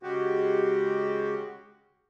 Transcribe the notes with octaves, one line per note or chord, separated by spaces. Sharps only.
C#3 G#3 F#4 G4